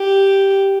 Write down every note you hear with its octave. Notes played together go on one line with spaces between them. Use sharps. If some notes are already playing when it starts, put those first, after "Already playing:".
Already playing: G4